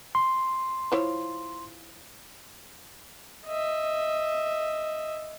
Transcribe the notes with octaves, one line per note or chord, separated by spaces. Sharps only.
C6
F3 E4 C#5
D#5 E5